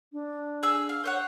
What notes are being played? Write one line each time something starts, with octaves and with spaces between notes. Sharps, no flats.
D4
G#4 E6
F5
C5 C#5 F#5